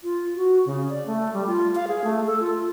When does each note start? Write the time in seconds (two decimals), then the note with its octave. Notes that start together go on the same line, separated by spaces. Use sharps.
0.04 F4
0.35 F#4
0.66 C#3
0.89 D5
1.06 A3
1.34 G3
1.47 F4
1.75 F5
1.88 G#4
2.04 A3
2.26 A4
2.40 F4